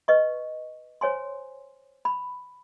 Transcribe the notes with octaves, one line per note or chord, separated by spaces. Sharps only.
B4 D#5 C#6
C5 C#5 G#5 C6
B5